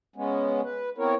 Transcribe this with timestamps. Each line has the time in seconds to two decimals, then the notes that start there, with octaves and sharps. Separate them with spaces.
0.16 C#3 G#3 B3 C#4
0.64 B4
0.98 B3 C4 E4 A#4 C#5